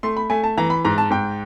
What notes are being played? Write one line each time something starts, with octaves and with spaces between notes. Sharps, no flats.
A3 C6
B5
A3 G#5
A5
E3 A#5
B5
G#2 A#5
A5
G#2 G5